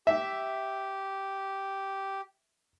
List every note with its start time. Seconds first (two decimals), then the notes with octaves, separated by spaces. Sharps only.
0.07 G4 E5